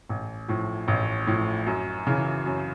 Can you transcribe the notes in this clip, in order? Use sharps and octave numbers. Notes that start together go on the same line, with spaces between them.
A1
A2 F3
A1
A2 F3
F#2
C#3 E3
F#2